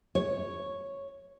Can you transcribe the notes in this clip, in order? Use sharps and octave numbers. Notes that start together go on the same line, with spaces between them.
C#5